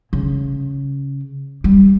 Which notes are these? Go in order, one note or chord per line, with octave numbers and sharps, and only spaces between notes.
C#3
G3